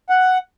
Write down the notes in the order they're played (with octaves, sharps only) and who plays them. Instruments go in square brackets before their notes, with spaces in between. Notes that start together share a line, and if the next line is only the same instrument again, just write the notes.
[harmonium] F#5